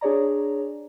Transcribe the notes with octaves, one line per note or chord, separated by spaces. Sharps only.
D4 G#4 C#5 D5 A#5